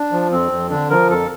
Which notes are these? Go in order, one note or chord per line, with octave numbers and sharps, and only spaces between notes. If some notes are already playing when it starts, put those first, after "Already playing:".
Already playing: D4
F3
F2 C4
F2
D3 D4
F3 A#4
F2 A4